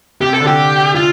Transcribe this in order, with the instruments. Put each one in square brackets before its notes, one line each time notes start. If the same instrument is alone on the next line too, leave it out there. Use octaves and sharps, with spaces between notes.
[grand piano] C3 [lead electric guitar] G4
[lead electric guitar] A4
[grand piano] D3
[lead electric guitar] G4
F4